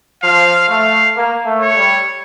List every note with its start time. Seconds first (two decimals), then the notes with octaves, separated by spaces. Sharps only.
0.22 F3 F5
0.68 A3 F5
1.15 A#3
1.45 A3
1.61 C#5
1.75 G3